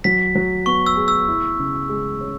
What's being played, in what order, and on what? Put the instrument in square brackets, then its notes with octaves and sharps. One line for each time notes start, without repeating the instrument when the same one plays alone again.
[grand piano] F#3 [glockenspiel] B6
[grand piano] F#3
[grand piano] B3 [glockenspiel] C#6
[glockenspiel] E6
[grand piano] G#4
[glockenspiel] E6
[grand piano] E4
C#3
G#3
C#4